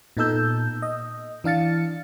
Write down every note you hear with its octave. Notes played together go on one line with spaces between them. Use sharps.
A#2 B3 D#4 A4 E6 G6
D#5
E3 D4 F5 A6 C#7